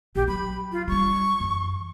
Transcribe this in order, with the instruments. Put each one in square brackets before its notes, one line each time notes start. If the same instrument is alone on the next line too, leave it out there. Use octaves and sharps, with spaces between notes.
[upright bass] A#1 [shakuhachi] G4
[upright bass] F#3 [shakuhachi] B5
[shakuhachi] F4
[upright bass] G3 D4 [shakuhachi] C#6
[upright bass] F#2 E3